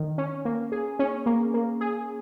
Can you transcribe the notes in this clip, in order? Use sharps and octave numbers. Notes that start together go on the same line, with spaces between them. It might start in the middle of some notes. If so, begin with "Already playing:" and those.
Already playing: D#3
C#4
A#3
G#4
C#4
A#3
A#3
G#4